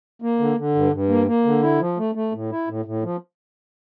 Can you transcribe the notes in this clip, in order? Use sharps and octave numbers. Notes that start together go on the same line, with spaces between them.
A#3
D3
D3
G2
G2
A#3
A#3
D3
E4
F3
A3
A3
A2
E4
A2
A2
F3